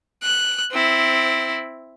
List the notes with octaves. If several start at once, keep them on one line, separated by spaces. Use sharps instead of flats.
F#6
C4 E4